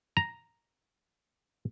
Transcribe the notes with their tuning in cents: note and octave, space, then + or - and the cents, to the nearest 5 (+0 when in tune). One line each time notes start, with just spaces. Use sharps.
A#5 +0